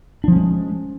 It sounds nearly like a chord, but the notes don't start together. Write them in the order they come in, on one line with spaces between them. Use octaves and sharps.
D4 F3 C#4 G#3